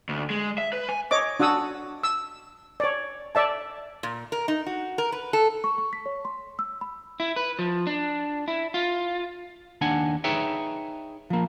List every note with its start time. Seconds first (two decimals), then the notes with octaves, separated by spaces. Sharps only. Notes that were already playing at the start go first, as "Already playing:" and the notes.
0.09 D2
0.30 G#3
0.58 E5
0.73 B4
0.89 G#5
1.11 C#5 D#5 D6
1.40 D4 F#4 F#5 D#6 E6
2.03 E6
2.80 C#5 D5
3.35 D5 E5 A5
4.03 A#2
4.32 A#4
4.48 D#4
4.66 F#4
4.98 A#4
5.12 B4
5.33 A4
5.64 C#6
5.78 C#6
5.93 B6
6.06 C#5
6.25 C6
6.59 E6
6.81 B5
7.20 E4
7.36 B4
7.59 F3
7.87 D4
8.48 E4
8.74 F4
9.81 D#2 D4 F#5 G#5
10.24 D#4 G#4 B4 C#5 E5 G5
11.30 F3 A#3